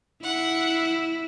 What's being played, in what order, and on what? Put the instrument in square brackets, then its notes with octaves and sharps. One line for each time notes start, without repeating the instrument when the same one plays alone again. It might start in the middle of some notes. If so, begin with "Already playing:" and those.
[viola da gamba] E4 [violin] F#5